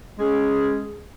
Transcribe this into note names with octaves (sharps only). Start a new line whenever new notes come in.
G#3 C#4 G#4